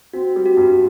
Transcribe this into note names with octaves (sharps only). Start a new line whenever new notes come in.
C4 F#4
G3
F#4
G2